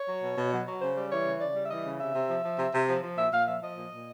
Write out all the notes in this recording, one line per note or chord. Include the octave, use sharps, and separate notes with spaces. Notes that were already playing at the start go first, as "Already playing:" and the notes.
Already playing: C#5
F#3
B2
B2
F#3
F#3
C#3 C5
G3
E3 C#5
C#3
C#3 D5
G3
E5
E3 D#5
C#3
C3 E5
C3
F3
F3
C3
C3
F3
F3
A#2 E5
A#2 F5
F3 E5
F3 D#5
A#2
A#2